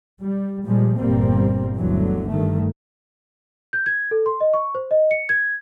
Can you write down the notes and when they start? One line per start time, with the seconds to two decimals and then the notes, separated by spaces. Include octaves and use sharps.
0.21 G3
0.65 A#2 F3 G3 G#3
0.98 G1 E2 A#2 G3 A#3 C4
1.76 G1 D2 D3 E3 F#3
2.30 G2 D#3 A3
3.73 G6
3.86 G#6
4.11 A4
4.26 C6
4.41 D#5
4.54 C#6
4.75 C5
4.91 D#5
5.11 C#7
5.29 G#6